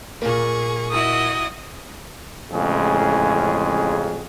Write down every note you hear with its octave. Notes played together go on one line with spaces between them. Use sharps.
A#2 A#3 G#4 C#6
E4 F#4 D#5 D#6
A1 F2 A2 C#3 G#3 G#4